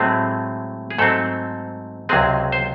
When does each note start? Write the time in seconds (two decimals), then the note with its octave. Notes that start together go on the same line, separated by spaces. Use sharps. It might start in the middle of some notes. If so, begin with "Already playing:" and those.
Already playing: A2 F#3 G#3 A3 C4 G#4
0.90 G#4
0.98 G#2 F#3 A3 C4 A4
2.09 C#2 C3 F#3 G#3 C4 G#4
2.52 C5